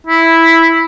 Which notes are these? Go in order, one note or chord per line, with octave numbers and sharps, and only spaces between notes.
E4